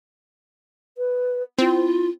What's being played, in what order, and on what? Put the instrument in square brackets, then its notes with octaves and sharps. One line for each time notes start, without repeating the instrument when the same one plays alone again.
[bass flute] B4
[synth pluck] C4 [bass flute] E4 [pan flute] F4